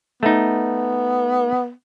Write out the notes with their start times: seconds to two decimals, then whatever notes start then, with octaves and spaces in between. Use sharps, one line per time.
0.23 A3 B3 D#4